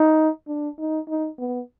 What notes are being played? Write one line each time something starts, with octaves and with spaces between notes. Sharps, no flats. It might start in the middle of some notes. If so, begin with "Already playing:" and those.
Already playing: D#4
D4
D#4
D#4
B3